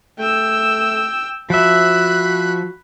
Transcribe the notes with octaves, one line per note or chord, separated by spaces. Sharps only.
A3 G5 E6
F3 F#4 E5 B5 F#6